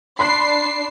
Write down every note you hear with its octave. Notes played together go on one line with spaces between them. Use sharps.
D4 B5 C6 F#6 C7